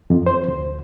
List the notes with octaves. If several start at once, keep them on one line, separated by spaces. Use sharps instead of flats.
F2
C5
D2